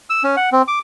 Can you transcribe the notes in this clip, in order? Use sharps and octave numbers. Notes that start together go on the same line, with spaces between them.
E6
C#4
F#5
C4
D6